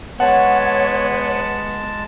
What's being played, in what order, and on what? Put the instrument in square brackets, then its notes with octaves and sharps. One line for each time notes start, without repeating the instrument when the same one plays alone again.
[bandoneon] G#3 A5 [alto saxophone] B3 [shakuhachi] C#5 [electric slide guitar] F#5